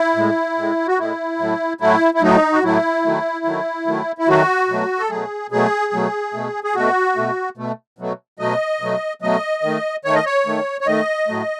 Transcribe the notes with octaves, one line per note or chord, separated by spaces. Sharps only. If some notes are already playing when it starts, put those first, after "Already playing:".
Already playing: E4
A2 G#3
A2 G#3
F#4
A2 G#3 E4
A2 F#3 A3
A2 F#3 A3 E4
E4
A2 F#3 A3 D#4
F#4
A2 F#3 A3 E4
D#3 F#3 A3
D#3 F#3 A3
D#3 F#3 A3
E4
D#3 F#3 A3 F#4
B2 F#3 A3
A4
B2 F#3 A3 G#4
B2 F#3 A3 G#4
B2 F#3 A3
B2 A3
G#4
B2 A3 F#4
B2 A3
B2 A3
B2 F#3 A3
B2 F#3 A3 D#5
B2 F#3 A3
B2 F#3 A3 D#5
D#3 A3
D#3 A3 C#5
D#5
C#5
D#3 A3
C#5
D#3 A3 D#5
A2 F#3 A3